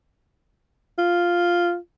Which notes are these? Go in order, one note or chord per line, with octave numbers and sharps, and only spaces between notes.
F4